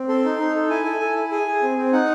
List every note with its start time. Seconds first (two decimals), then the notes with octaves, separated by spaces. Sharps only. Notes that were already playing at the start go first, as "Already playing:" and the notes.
Already playing: C4
0.09 A4 C6
0.25 D#4
0.39 D#4
0.55 A4
0.70 E4 G#5
0.86 A4
1.01 A4
1.16 E4
1.31 G#4 G#5
1.47 G#4
1.63 C4
1.78 C4
1.93 D#4 F#5